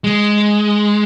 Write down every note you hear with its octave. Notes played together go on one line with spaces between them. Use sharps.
G#3